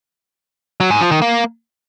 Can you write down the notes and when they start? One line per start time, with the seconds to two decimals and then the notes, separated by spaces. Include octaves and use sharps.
0.80 F#3
0.91 G#2
1.01 F3
1.11 D#3
1.22 A#3